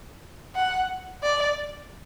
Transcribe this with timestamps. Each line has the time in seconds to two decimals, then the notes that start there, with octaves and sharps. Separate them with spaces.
0.55 F#5
1.23 D5